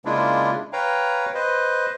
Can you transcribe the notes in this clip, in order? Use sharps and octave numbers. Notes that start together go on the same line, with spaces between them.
C#3 G#3 A#3 D4 E4 F4
B4 C#5 F5 G5 A#5
B4 C5 D#5